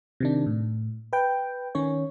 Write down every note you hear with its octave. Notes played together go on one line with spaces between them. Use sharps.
C3 D#3 D4
A2
B4 G5
D#3 C#4 C#5